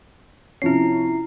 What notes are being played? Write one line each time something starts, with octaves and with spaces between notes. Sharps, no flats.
C3 F3 C#4 E4 C7